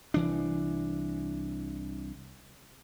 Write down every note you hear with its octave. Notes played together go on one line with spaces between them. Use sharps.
C2 E3 D4